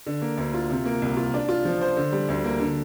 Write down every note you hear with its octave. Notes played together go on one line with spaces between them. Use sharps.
D3
A#3
D2
F4
C3
A#3
C2
F4
D4
F4
F3
C5
D3
G3
D2
A#3
D3